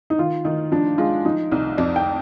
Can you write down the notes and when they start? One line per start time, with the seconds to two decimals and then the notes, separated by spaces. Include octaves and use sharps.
0.10 D#4
0.18 D#3 F4
0.44 D#3 D#4
0.72 F3 D4
0.98 G#3 F4
1.25 F3 D#4
1.52 C2 D#4
1.78 F2 D5
1.96 G5